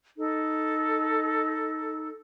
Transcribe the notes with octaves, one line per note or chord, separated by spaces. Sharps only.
D#4 A4